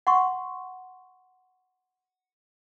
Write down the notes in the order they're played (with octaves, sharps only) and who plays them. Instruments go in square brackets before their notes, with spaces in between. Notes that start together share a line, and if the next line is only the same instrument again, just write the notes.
[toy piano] F#5 C6 C#6